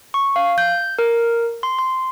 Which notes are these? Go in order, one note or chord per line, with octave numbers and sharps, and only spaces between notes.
C#6
F5
G6
A#4
C6
C6